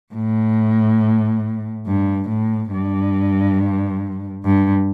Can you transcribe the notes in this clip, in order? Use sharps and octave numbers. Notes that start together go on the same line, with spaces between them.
A2
G2
A2
G2
G2